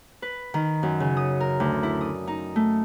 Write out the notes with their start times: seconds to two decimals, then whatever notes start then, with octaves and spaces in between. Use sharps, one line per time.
0.22 B4
0.54 D#3
0.83 F#2
1.00 C#3
1.17 D#6
1.40 A#4
1.60 D2
1.83 E4
2.01 D#6
2.27 D#4
2.56 A3